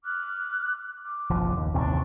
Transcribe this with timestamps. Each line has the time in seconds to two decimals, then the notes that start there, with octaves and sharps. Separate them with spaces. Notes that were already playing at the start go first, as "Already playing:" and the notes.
0.04 D6 F6 F#6
1.06 D6
1.30 F#1 B1 F3
1.57 D#2
1.74 A1 D#2 C3 D4 C6 C#6